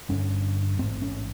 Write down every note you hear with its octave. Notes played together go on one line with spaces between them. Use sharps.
G1 G2 D3 C#4
A1 G#2 C4
C#4